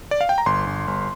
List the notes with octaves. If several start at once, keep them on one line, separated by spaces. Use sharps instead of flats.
D5
F5
G5
A#5
G1 C6
G1
G1